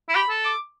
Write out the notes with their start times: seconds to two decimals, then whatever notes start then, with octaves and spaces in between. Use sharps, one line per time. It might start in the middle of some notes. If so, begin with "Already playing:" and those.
0.09 E4
0.15 G4 B5
0.29 A4
0.44 D6